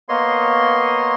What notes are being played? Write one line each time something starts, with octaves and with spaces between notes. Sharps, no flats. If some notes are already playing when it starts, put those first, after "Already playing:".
A#3 B3 C#5 D#5 C6